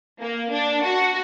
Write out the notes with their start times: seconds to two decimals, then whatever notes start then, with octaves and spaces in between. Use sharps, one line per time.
0.21 A#3
0.52 D4
0.84 F#4